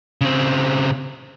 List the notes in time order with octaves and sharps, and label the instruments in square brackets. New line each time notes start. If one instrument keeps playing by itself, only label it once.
[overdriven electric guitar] C#3 C4